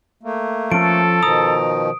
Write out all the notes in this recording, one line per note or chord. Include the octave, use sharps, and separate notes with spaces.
A3 A#3
F3 C#4 A4 D7
B2 D#3 F3 A#5 D#6